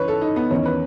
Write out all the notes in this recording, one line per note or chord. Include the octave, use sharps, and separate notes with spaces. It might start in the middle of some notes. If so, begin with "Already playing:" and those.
Already playing: C#3 E3 B4 C#5
A4
D#4
B3
E2 D#3 C#4
B4